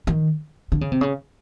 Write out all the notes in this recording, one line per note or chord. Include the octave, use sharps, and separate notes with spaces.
D#3
D3
C#3
C3
C#3